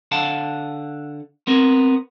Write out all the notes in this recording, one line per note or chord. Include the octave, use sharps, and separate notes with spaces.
D3 F5 F#5 A5
B3 C4 A#4